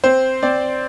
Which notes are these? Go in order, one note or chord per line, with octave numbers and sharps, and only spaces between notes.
C4 C5
C4 D5